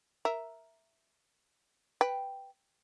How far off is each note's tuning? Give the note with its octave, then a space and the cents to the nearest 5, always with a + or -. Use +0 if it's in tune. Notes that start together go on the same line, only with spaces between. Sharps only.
A#4 +0 E5 +0
B4 +0 G5 +0